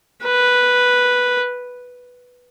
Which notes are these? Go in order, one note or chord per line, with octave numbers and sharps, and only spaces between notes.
B4